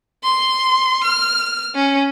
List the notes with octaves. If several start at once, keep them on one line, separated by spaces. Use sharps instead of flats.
C6
F6
C#4